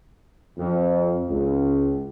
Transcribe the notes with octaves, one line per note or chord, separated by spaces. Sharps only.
F2
C#2